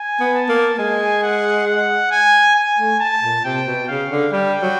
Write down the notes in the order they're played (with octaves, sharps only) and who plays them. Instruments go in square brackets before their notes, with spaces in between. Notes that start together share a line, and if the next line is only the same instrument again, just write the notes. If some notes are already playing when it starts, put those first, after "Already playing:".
Already playing: [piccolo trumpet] G#5
[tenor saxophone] B3
[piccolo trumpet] A5
[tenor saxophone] A#3
[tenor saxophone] G#3 [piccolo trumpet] G#5
[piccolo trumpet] F#5
F#5
G#5
G#5
[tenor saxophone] A3
[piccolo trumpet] A5
[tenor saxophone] A#2
[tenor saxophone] C3 [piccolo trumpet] G5
[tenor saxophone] B2
[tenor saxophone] C#3 [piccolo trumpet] F5
[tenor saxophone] D3
[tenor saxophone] G3 [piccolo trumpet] G5
[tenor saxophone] F#3